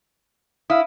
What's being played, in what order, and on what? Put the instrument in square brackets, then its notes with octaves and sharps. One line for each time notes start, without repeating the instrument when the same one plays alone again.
[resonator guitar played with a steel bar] E4 [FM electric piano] E5 F5 D#6